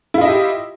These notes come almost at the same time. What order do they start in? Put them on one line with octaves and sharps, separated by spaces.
E4 F4 D#5 E5 G4